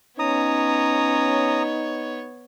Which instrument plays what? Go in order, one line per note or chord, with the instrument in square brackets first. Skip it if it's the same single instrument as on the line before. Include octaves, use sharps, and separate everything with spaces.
[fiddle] B3 C#5 [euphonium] C#4 [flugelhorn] D#4 [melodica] A#5 D#6